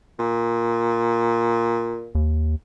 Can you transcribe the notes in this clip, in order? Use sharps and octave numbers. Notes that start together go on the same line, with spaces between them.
A#2
D#2